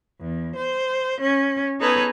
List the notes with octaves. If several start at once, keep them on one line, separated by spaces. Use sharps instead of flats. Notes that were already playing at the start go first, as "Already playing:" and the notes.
E2
C5
C#4
B3 D#4 G#4 A4 B4 C#5